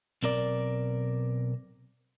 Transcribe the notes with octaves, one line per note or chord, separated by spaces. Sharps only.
B1 C4 A#4 D5